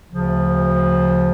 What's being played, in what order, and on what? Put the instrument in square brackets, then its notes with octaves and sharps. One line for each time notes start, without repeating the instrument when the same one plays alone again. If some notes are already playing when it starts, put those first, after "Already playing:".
[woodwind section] D2 C#3 F3